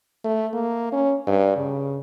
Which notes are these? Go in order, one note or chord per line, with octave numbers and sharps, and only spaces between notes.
A3
A#3
C#4
G2
C#3